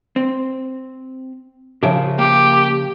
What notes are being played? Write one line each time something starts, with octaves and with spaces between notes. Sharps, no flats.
C4
C#3 F3 G4 A#4 E5
A#3 G4